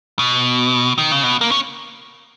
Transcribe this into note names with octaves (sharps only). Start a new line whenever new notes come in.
B2
D#3
C#3
B2
A#3
C#4